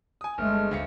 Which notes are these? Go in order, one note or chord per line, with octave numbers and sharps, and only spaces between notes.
G#5 D#6
G1 G#3 A3 F6
D2 F5 C#7